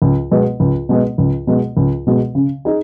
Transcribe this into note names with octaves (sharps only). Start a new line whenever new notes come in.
C#2
B2 G#3 B3
C#2
B2 G#3 B3
C#2
B2 G#3 B3
C#2
B2 G#3 B3
C#3
D#4 G#4